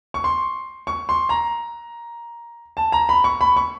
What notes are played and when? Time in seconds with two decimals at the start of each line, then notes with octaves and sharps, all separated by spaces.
0.14 C#6
0.24 C6
0.87 C#6
1.09 C6
1.29 A#5
2.77 A5
2.92 A#5
3.09 B5
3.24 C#6
3.41 B5
3.56 C#6